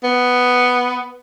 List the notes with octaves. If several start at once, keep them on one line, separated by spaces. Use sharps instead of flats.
B3